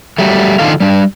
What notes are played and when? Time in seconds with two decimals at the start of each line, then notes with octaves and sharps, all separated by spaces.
0.18 F#3 G3 A3
0.59 D3 D#3 F4 A4 F5
0.80 G3 D4